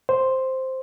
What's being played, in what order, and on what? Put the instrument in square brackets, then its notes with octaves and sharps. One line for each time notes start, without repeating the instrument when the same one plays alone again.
[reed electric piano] C5